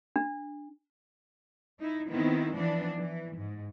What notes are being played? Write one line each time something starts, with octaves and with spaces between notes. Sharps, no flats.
D4
D#4 E4
D#3 B3 C4 E4
E3 F3 B3 D4
E3
G#2